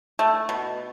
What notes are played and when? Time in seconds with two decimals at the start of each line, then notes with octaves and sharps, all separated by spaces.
0.19 A3
0.49 B2